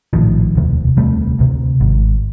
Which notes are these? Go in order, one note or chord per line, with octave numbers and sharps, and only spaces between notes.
A#1 A2 D#3 F3
E1 D2 C3
E1 D2 C3 G3 A3
D2 C3
G#1 G#2